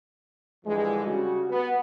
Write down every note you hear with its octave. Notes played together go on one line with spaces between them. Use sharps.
G2 D3 E3 F3 G3 G#3
C#3 G3 F#4
B3